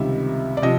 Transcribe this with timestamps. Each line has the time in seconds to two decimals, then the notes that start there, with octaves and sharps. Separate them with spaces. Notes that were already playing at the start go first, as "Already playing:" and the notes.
Already playing: C#2 C3 D#3 G3 E5
0.57 D5
0.62 C3 F3 D#5